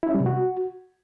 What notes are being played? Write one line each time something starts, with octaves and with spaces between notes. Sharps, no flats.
E4
C#4
G3
C3
F#4